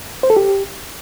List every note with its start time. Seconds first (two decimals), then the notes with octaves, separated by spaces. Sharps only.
0.23 C5
0.30 A4
0.37 G4